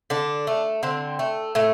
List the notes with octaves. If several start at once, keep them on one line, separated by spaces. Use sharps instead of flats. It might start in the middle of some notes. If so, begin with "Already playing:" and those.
D3 D4
A3
D3 C4
A3
A2 A3